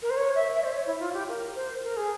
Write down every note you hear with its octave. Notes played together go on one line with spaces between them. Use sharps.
A#4
C5
C#5
E5
E5
C5
C#5
E4
F4
G4
A#4
C5
A#4
G#4